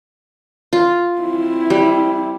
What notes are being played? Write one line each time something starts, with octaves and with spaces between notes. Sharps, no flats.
F4
C4 E4
G3